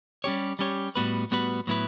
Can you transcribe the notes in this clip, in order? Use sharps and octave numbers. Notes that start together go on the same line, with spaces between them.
G3 C#4 G4 C#5
G3 C#4 G4 C#5
A2 G3 B3 F#4 B4
A2 G3 B3 F#4 B4
A2 F#3 B3 E4 B4